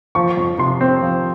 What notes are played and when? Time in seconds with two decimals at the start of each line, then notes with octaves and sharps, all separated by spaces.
0.15 F3 C#6
0.37 F2
0.58 C3 C6
0.81 C4
1.02 F3